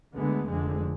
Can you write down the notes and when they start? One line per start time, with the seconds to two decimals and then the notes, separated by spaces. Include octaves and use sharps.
0.14 D2 D3 G#3 B3
0.47 F1 F2 D3 G#3